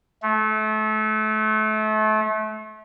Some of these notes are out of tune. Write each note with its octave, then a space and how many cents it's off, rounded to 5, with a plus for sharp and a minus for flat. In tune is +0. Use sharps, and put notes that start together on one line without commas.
A3 -30